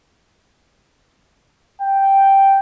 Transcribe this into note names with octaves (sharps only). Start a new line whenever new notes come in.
G5